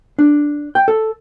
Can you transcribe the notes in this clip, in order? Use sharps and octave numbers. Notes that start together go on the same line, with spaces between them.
D4
G5
A4